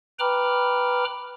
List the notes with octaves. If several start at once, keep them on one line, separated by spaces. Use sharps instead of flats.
B4 G5 A#5 B5 D6 F6